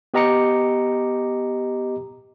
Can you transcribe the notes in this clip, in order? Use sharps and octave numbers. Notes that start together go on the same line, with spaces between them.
B3 G4 D#5 A#5 D6 C#7